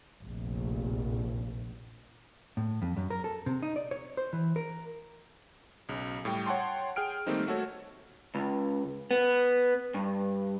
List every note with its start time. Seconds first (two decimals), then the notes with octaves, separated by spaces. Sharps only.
0.24 F1 A#1
2.57 A2
2.82 F2
2.97 F#2
3.10 A#4
3.24 A4
3.46 C3
3.63 D#4
3.76 D5
3.91 C#5
4.17 C5
4.33 E3
4.56 A#4
5.89 B1 C#3
6.25 A2 G3 G5
6.47 C#5 F#5 G5 A5 C6
6.96 G#4 G5 F6 D7
7.27 D#3 G3 A3 A#3 C4 D#4
7.47 A3 F#4 A4 C#5
8.35 C#2
9.11 B3
9.94 G2